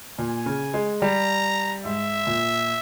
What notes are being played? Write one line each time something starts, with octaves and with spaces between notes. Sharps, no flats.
A#2 G#5
C#3
G#3
G3 A#5
G#2 E5
A#2